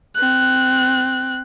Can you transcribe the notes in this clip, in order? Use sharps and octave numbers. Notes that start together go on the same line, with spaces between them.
C4 F#6